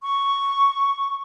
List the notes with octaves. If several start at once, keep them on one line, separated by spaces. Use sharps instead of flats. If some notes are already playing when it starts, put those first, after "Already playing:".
C#6